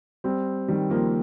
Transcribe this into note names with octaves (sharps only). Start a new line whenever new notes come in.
G3 C4
D#3 G3
F3 A#3